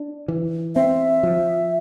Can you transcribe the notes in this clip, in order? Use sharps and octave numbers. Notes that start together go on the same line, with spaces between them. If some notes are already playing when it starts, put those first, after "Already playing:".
Already playing: D4
E3
C4 E5
F3